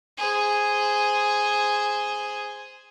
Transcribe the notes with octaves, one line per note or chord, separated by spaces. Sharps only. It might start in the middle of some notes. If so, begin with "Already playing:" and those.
G#4 C5